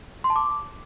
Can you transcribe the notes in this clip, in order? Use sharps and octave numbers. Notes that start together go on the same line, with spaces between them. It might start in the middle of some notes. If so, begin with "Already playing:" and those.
C6
A5
D6